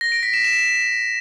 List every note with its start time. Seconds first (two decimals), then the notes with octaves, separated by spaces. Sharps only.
0.01 A#6
0.12 D7
0.23 B6
0.34 E7
0.44 E7